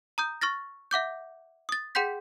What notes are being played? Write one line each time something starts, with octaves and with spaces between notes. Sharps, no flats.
A#5 D#6 G6
C#6 F6 A6 A#6
E5 F#5 D6 G6
D#6 A6
G#4 F#5 G5 C6 G6 B6